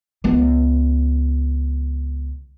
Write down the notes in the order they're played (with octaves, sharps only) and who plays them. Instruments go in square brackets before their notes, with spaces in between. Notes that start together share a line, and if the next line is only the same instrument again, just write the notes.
[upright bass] C#2 B3